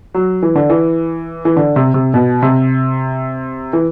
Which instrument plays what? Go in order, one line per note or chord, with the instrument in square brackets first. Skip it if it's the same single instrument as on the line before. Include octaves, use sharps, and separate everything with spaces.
[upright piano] F#3
E3
D3
E3
E3
D3
C3
C3
B2
C3
E3